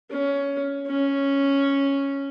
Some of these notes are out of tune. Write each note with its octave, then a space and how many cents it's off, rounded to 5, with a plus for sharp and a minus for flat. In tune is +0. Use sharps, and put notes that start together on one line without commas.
C#4 +15
C#4 +0